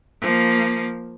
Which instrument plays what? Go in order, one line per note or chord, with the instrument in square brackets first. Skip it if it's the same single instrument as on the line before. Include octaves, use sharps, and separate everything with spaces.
[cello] F3 A#3